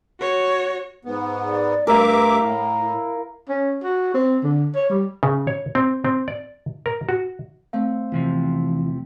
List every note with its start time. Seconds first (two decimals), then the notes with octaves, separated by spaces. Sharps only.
0.20 F#4 C#5
1.05 G#2 B3
1.48 D5
1.87 G2 A3 A#4 E5 F5 D6
2.39 A2
2.80 E4
3.49 C#4
3.84 F#4
4.15 C4
4.44 D3
4.75 C#5
4.90 G3
5.23 C#3
5.47 C#5
5.75 C4
6.05 C4
6.28 D5
6.86 A#4
7.09 F#4
7.73 A3 C4 F5
8.12 E2 C3 E3 F3